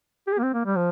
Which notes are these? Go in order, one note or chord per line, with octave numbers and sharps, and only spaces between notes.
G4
G#4
A#3
C4
A#3
G3
F3